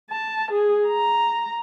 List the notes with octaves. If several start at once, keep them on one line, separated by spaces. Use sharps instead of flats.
A5
G#4
A#5